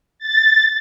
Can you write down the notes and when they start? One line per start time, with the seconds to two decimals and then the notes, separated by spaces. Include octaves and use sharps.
0.19 A6